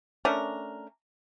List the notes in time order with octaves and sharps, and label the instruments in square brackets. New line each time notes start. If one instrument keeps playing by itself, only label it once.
[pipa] A3 C#4 D4 A#4